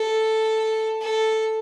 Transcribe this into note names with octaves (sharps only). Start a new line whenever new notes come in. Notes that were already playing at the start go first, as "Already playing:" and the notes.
Already playing: A4
A4